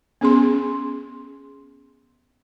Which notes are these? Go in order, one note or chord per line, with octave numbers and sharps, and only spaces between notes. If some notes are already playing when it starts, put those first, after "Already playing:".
B3 C#4 G#4 C6